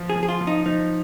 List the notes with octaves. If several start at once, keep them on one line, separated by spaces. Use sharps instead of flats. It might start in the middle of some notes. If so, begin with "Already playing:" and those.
Already playing: F3
G#4
F3
G#4
F4
F3
D#4
F3 D#4